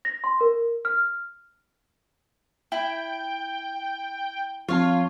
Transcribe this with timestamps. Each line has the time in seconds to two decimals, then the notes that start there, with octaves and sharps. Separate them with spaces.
0.05 A#6
0.24 C6
0.41 A#4
0.85 F6
2.72 E4 G5
4.68 F3 C4 F4 C#5 F5 A5